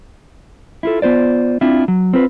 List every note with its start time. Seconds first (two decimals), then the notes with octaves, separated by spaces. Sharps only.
0.83 E4 F4 A4
1.02 B3 F4 C5 D5
1.61 C4 D4 E4 F4
1.88 F#3
2.13 C4 F4 B4